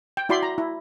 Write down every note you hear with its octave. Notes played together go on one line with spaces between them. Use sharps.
G5
E4 F#4 D5 B5 C6
A#5
E4